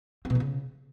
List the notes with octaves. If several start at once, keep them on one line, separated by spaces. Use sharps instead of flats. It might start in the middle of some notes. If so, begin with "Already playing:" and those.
C4
B2
D3
C#3